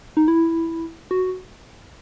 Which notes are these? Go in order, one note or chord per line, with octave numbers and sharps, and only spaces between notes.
D#4
E4
F#4